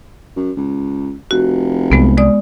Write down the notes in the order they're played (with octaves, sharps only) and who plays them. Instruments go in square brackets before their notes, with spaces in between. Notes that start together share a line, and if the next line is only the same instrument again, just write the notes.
[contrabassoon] F#2
C#2
[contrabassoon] F1 [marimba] F#4
[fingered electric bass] C2 [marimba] G#3 B3
[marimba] G#3 D5 D#6